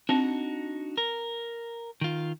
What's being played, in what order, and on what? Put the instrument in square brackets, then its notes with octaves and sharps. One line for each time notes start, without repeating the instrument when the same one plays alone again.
[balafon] C4 [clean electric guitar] D4 D#4 F#4
[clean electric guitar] A#4
D#3 F4